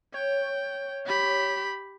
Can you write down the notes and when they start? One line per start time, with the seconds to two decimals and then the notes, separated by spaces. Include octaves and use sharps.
0.14 C#5 G5
1.06 G4 B5